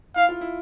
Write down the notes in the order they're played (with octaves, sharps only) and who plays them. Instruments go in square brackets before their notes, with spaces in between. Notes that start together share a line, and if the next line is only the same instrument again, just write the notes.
[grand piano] E4 [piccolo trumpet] F5
[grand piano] F4
E4